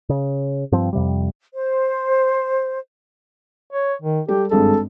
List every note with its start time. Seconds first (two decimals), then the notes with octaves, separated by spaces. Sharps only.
0.09 C#3
0.72 G2 F3 C4
0.93 F2 C3 G3
1.53 C5
3.73 C#5
4.02 D#3
4.28 G3 G4 A4
4.51 G#1 G2 G#3 A4